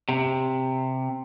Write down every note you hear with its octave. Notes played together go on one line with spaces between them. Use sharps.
C3